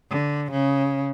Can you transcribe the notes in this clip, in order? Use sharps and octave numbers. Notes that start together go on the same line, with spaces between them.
D3
C#3